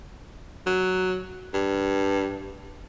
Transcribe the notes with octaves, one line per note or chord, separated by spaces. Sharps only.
F#3
G2